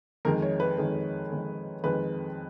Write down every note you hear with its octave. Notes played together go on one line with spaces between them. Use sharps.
F2 D#3 G#3 A#4
C#5
B4
F2 D#3 G#3
F2 D#3 G#3
F2 D#3 G#3 B4